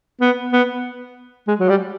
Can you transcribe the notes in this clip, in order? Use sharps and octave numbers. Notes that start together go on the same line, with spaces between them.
B3
B3
G#3
F#3
G3